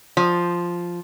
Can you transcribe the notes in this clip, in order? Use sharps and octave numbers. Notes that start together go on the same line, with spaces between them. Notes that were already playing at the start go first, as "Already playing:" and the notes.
F3